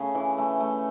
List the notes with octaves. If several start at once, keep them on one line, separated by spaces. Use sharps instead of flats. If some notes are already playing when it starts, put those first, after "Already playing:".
Already playing: C#3 A3 G#4
E3
A3
A3